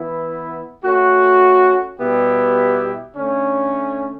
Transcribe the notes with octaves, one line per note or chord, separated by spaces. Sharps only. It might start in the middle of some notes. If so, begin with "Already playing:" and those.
Already playing: E3 B3 E4
A3 C#4 F#4
B2 G3 B3 E4 G4
D3 A3 C#4